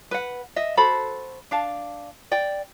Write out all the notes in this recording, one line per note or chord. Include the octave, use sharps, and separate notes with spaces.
B4 F#5
D#5 E5
F#4 A4 C5 B5
D4 F5 A5
D5 G5